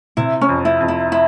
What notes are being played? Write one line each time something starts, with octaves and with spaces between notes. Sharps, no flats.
C3 E4
C#4
F2
E4
F2
E4
E4